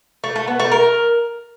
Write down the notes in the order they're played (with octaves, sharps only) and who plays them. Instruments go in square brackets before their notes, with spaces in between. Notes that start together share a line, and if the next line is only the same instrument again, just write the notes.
[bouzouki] A3
A3
B3
A3
A#4